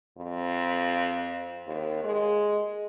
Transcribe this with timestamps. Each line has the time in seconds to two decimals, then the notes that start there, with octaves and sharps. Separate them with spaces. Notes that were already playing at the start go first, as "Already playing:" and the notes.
0.18 F2
1.66 D#2
2.04 G#3